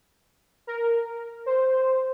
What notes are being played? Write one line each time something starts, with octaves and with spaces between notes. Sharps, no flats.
A#4
C5